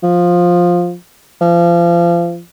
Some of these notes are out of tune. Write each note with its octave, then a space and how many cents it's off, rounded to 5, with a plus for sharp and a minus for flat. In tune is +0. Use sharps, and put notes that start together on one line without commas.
F3 +10
F3 -30